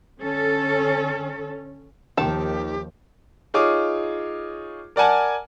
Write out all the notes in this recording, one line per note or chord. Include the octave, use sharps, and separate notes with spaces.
D3 C#4 A4
D#2 D#3 F3 G4 A5
D#4 F4 G#4 C#5 D6 D#6
A#4 D5 F#5 G#5 A5